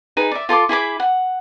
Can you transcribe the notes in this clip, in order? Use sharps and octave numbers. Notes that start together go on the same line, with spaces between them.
D#4 G#4 B4
D5 E5
F4 A4 C6 D6
E4 G#4 B5 D6
F#5